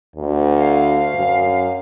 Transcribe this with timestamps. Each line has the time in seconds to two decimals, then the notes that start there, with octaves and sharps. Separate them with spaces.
0.16 D2
0.59 F5
1.15 F#2